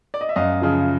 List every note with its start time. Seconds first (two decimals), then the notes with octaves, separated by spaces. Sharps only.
0.14 D5
0.21 D#5
0.29 E5
0.36 F#2 D#5 F5
0.62 C#3 F3